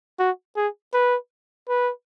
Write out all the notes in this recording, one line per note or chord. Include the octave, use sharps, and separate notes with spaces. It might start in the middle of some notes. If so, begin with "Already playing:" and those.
F#4
G#4
B4
B4